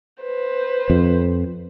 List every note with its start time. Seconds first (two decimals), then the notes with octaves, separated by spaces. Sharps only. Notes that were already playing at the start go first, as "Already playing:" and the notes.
0.23 B4 C5
0.90 F2